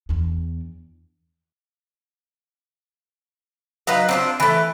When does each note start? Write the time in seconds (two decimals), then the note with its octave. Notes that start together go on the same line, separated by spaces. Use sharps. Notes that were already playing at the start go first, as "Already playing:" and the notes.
0.09 E2 D4
3.87 F#3 D#4 B4 F5
4.09 C4 D4 F4
4.40 E3 A3